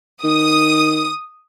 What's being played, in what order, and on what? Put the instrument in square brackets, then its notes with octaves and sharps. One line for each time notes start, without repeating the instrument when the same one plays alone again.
[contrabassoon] D#3 [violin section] D#6